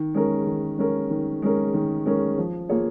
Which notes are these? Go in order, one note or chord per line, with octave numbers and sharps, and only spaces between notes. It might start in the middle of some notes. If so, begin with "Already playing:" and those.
Already playing: D#3
G#3 C#4 A#4
D#3
G#3 C#4 A#4
D#3
G#3 C#4 A#4
D#3
G#3 C#4 A#4
F3
A#3 F4 G#4 C#5